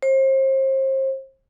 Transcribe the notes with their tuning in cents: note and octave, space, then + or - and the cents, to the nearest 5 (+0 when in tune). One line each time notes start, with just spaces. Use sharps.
C5 +35